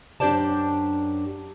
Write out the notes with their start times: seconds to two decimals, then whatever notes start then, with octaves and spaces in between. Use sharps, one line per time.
0.20 F#2 D4 G4 C5 D5 A5